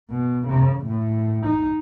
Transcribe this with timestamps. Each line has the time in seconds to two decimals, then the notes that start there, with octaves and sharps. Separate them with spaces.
0.10 B2
0.48 C#3
0.85 A2
1.46 D#4